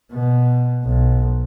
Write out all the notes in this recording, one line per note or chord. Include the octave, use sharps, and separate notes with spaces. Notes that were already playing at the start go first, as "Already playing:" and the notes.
B2
B1